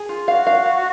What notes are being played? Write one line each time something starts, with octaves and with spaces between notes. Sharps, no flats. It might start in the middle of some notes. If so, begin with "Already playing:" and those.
Already playing: G#4
F4
F#4 F5
F5
F5